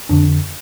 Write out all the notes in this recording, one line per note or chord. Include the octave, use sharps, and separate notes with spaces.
F2 D3 D4